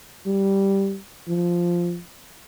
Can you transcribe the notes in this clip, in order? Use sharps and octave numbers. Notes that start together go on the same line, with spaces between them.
G3
F3